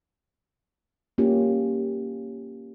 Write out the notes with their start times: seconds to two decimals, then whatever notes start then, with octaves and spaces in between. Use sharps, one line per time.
1.18 A#3 C#4 F4 G4